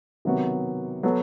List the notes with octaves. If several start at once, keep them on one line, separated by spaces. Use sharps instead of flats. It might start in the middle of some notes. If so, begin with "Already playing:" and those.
C3 D#3 F#3 B3 F#4
F#3 B3 F#4 A4